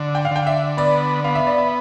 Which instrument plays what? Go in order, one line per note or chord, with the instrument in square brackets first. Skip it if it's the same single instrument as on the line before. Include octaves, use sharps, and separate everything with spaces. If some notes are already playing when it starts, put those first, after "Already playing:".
Already playing: [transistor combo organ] D3
[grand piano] G5
F5
[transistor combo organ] D3 [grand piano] G5
[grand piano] E5
[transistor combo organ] B3 [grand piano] D5
[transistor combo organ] B3 [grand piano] F5
[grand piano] E5
D5
E5